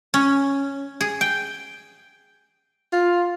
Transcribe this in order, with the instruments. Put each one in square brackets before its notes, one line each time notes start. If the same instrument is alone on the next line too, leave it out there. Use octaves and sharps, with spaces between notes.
[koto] C#4
G#4
G5
[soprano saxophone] F4